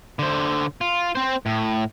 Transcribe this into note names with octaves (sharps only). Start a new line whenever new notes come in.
D3 C5
F4
C4 C5
A2